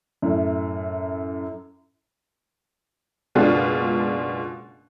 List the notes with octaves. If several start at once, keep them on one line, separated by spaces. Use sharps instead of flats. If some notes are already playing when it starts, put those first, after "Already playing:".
F#2 A2
F#1 B2 G#3 D4 F4 F#6